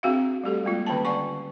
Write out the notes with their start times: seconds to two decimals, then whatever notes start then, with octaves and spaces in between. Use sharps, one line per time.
0.03 C4 D4 F#4 G#4 E5 F5
0.43 G3 A3 G4 A4
0.64 G3 G#3 A#3 F4
0.87 D3 D#3 C#4 G5 A5
1.05 D5 F#5 G#5 A5 C#6